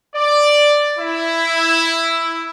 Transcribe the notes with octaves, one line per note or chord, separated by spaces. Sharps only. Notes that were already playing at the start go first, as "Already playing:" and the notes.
D5
E4